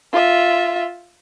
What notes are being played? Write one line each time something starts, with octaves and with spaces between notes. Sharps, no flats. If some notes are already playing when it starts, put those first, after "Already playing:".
F4 E5